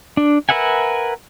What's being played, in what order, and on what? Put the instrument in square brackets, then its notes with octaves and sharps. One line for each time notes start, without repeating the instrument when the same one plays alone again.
[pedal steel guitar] D4
A#4 B4 E5 F#5 G#5